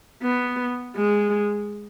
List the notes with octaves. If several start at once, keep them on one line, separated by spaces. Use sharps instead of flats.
B3
G#3